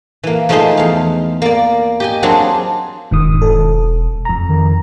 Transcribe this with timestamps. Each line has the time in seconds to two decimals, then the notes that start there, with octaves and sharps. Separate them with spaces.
0.23 E3 A#3
0.49 F3 A3 D#4 F4 G#4 C5
0.77 E2 F5
1.42 A#3 D5
2.00 G4 D#5 G#5
2.23 F#3 A#3 C4 D4 G#4
3.11 E1 G#2 D#3 D#6
3.42 A4
4.25 F2 A#5
4.49 D#3